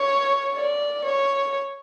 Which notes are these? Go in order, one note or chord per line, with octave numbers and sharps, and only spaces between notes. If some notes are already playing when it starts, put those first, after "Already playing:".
Already playing: C#5
D5
C#5